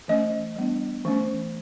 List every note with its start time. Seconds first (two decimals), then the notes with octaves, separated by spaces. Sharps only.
0.08 E3 A3 C#4 D#5
0.56 G3 B3 D4
1.05 E3 A3 C#4